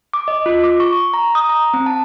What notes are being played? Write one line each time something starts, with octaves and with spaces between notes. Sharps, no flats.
D6
D#5
F4
D6
C#6
A#5
D#6
A#5
C4
A5